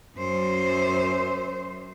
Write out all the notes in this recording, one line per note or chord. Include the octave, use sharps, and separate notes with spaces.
F#2 C5